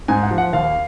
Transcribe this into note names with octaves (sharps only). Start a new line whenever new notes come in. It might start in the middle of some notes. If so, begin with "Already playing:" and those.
G#2 G#5
F#5
F3
F#5
D#2 F5